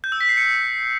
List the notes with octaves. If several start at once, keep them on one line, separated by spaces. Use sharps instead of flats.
G6
E6
B6
C7
C#7